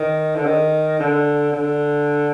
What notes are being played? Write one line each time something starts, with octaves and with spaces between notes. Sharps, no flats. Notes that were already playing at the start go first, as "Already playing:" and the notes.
Already playing: D#3
D3
D#3
D3
D3